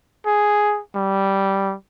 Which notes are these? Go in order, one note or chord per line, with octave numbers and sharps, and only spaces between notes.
G#4
G3